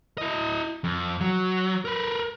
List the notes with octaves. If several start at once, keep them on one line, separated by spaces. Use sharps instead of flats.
E4 D#5
F2
F#3
A#4 B4